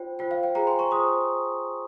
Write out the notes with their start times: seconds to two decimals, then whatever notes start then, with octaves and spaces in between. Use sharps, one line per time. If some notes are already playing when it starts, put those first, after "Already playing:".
Already playing: F4 C5 G5
0.19 F4 C5 G5
0.31 F5
0.43 G5
0.55 F4 G#4 C5 G5 A#5
0.67 G#5 C6
0.79 A#5 C#6
0.91 F4 G#4 C5 C6 D#6